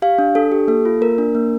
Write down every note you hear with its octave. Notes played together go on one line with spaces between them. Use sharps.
G4 F5
D4
D4 A4
G4
A#3 A4
F4
A#3 A#4
D4
A#3